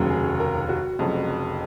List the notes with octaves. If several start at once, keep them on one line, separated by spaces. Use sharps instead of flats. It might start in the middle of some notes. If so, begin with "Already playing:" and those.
Already playing: F1 D#2 C#3 F#3
G#4
A#4
F#4
F1 F2 C#3 F#3